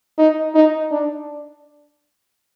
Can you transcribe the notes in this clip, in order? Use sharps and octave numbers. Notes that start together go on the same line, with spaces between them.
D#4
D#4
D4